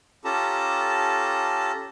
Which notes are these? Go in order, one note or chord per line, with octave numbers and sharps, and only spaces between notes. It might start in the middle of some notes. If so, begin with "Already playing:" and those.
C#4 F4 G4 A4 A5 A#5